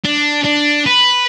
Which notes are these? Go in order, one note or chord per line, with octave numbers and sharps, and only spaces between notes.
D4
D4
B4